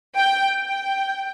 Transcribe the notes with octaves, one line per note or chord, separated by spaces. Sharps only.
G5
G5